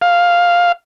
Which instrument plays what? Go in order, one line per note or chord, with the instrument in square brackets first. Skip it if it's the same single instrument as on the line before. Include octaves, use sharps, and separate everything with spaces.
[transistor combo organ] F5